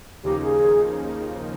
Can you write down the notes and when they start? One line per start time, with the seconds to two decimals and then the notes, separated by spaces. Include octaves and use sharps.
0.24 D#2 C#3 F3 A#3 D#4 G4
0.42 G#4